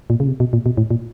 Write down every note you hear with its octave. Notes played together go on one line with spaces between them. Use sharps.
A#2
C#3
C3
B2
A#2
B2
A2
A#2